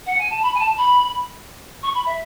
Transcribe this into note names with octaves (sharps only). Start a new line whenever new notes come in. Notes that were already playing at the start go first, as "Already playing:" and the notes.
F#5
G#5
A5
B5
G#5
A5
B5
C#6
B5
E5